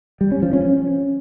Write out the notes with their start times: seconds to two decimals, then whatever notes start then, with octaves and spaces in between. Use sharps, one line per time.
0.21 G3
0.31 C#4
0.42 F3
0.53 C#4